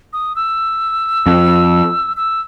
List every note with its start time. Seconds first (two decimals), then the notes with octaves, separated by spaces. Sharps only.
0.13 D#6
0.36 E6
1.26 F2
2.17 E6